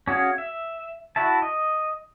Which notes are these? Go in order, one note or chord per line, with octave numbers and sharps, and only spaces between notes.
C#4 F#4 G#4 F5
E5
E4 F#4 E5 A5
D#5